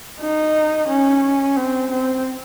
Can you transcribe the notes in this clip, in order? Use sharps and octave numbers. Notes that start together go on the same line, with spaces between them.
D#4
C#4
C4
C4